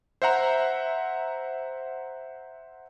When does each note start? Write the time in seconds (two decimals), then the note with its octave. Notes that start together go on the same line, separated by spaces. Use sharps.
0.22 C5 E5 F#5 A#5